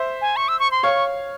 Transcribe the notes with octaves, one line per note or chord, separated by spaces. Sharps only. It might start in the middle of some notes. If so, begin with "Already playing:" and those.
Already playing: C5 E5
G#5
C#6
E6
C#6
C6
C#5 F5 C#6